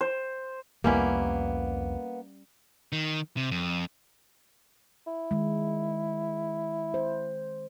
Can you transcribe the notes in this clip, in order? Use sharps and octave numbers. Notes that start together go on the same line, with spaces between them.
C5
C2 F2 G3 A#3 B3 C#4 E4
D#3
C3
F2
E4
D#3 G#3
C5